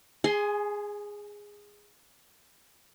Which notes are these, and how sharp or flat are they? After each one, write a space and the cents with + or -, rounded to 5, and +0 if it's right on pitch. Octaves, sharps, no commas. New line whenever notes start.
G#4 -10 G#5 +25 C6 +0